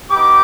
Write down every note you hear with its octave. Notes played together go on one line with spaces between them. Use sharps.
B3 D#4 G4 D6